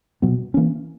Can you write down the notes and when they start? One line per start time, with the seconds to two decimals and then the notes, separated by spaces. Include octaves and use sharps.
0.22 B2 F#3 B3
0.54 E3 A#3 C#4